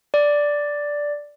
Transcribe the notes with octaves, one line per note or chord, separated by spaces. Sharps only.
D5